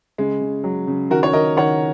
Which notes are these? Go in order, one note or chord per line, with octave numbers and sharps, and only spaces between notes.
C#3 G#3
C#3
F#3
C#3
D#3 F#4 A#4
C#5
D#3 A#4 D#5
D#3 C#5 F#5